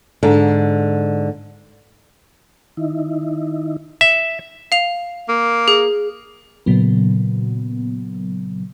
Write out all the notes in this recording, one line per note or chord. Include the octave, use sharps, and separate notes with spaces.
G#2 D3
D#3 D#4 E4
E5
F5 F7
A#3
G#4
A#2 C#3 F#3 B3